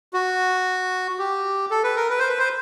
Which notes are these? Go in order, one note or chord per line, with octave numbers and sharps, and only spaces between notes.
F#4
G4
A4
B4
A#4
B4
C5
B4
C5